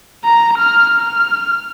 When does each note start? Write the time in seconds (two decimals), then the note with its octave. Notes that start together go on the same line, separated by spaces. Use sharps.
0.24 A#5
0.58 F6
0.99 F6